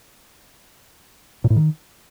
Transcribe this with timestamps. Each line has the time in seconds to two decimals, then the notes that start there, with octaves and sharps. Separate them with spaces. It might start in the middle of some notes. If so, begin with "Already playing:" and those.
1.44 A#2
1.50 A2
1.56 D#3